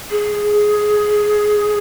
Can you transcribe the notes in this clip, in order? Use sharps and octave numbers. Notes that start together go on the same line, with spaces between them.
G#4